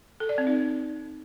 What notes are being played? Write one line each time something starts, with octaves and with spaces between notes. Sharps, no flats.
A4
D5
C4
D#4